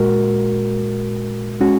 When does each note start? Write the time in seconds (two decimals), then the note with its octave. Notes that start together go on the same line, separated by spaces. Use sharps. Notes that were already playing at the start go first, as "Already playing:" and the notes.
Already playing: A#2 G#3 F#4 A#4
1.61 G#3 C#4 F#4